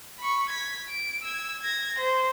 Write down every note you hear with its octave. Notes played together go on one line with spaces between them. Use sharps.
B5 C#6
G#6 B6
D7
E6 G#6
G#6 A#6
C5